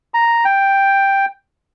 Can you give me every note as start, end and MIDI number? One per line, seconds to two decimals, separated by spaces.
0.14 0.44 82
0.45 1.26 79